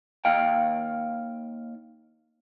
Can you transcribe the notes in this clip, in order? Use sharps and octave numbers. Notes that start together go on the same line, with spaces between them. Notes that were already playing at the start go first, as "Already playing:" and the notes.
D#2 D#3 F5 G5